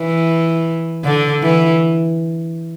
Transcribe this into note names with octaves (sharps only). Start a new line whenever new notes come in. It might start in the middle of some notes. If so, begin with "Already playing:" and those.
Already playing: E3
D3
E3